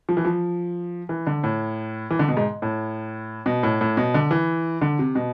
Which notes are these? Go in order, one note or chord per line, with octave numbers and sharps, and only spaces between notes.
F3
E3
F3
E3
D3
A2
E3
D3
B2
G#2
A2
B2
A2
A2
B2
D3
E3
D3
C3
B2